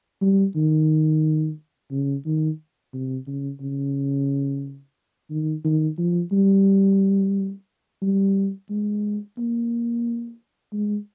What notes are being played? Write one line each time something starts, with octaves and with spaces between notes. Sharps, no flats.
G3
D#3
C#3
D#3
C3
C#3
C#3
D#3
D#3
F3
G3
G3
G#3
A#3
G#3